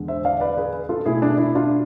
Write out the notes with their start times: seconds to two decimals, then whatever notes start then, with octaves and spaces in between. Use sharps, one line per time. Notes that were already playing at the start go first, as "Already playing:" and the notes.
Already playing: E2 D3 G#3
0.08 C5 E5
0.25 D5 F5
0.41 B4 D5
0.57 G#4 B4
0.89 F4 A4
1.05 B2 A3 E4 G#4
1.22 D4
1.38 E4
1.55 D4 F4